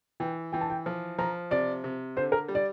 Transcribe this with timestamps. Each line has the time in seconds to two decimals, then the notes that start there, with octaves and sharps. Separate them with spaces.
0.20 E3 G5
0.53 E3 G5
0.61 A5
0.70 G5
0.86 F3
1.19 F3 A#5
1.51 C3 D5
1.84 C3
2.16 D3 C5
2.32 A#4
2.48 G3
2.55 D5